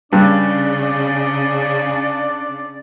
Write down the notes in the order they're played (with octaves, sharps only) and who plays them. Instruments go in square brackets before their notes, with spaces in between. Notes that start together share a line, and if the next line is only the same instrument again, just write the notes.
[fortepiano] G2 [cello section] C#3 [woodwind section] D4 D5